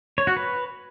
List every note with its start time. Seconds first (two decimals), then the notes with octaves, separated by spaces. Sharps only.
0.18 C#5
0.27 F#4
0.37 B4